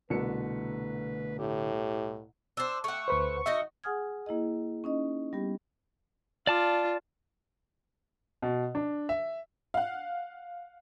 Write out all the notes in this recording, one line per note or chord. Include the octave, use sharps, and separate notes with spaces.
C2 B2 D3 A3 B4 C#7
A2 G4
D4 C5 E6
A3 F#5 C#6
D2 B4 C5
D#4 F#4 D#5 E5
G#4 F#5 G#5 D#6 F6 G#6
A#3 E4 G#4 D#5
C#4 D#4 D#5
G3 B3 G4
F4 D5 A5 D6
B2
D4
E5
F5 F#5